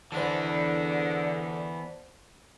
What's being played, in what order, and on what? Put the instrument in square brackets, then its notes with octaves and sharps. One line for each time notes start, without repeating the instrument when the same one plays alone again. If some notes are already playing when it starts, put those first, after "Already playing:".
[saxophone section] D3 [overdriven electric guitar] E3 B3 [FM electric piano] C5 D5 A5